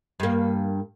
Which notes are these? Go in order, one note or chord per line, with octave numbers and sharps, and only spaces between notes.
G2 A#3